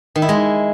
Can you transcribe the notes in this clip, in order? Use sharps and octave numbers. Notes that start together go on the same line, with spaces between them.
D#3
E4
G#3